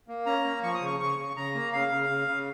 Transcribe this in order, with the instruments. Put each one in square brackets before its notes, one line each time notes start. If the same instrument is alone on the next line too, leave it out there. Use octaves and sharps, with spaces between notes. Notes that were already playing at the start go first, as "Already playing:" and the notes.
[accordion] A#3
C#4 A#5
A#3
F3 C#6
D#6
C#3 C#6
C#3 C#6
C#3
C#3 A#5
A#3
C#3 F5
C#3
C#3
C#3